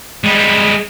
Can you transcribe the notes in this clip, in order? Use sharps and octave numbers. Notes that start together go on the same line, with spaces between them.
G3 G#3